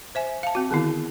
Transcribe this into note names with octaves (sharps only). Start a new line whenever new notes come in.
C5 E5 G#5
F5 A5
C4 F#4
D3 D#3 B3 E4